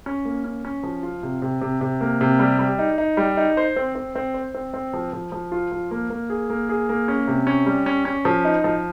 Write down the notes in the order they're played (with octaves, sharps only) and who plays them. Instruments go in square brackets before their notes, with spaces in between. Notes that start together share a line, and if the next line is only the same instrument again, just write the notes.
[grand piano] C#4
A#3
C#4
C#4
F3
F4
C3
C3
C3
C3
A#3
C3
G3
G3
D#4
D#4
G3
D#4
C5
C4
C4
C4
C5
C4
C4
F3
F3
F3
F4
F3
A#3
A#3
G#4
A#3
G#4
A#3
C#4
C3
C#4
G3
C#4
C#4
F3
D#4
F3